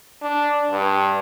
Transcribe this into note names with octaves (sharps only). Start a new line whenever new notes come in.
D4
G2